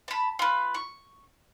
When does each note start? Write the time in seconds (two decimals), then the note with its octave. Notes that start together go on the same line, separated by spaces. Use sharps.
0.08 A5 B5
0.39 F4 B4
0.74 C#6